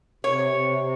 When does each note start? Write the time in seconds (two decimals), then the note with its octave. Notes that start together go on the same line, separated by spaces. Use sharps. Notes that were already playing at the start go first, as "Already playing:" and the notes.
0.24 C3 C#5
0.50 C3
0.78 C3